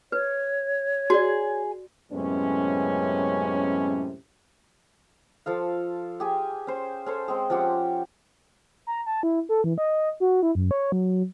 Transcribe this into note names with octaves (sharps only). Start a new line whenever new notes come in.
B4 C#5
F#4 G#4 D5
F#2 A2 C3 G#3 B3 C#4
F3 A4 F5
G4 G#4 G#5
C#4 C5
C#4 A4 C5 C#5
G#3 C4 G#4
F3 C#4 G4 F#5
A#5
A5
E4
A4
E3
D#5
F#4
E4
F#2
C#5
F#3